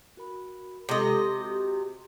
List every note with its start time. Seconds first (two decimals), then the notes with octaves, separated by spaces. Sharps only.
0.17 F#4 A#4 B5
0.89 C3 G#3 F4 A4 D#5
1.38 F#4 G4